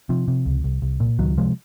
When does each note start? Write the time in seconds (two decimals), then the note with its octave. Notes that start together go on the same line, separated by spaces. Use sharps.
0.09 C3 F3
0.28 C3
0.46 C#2
0.64 C2
0.82 C2
1.00 A#2
1.19 C#2 D#3 F#3
1.37 C3 F3 G#3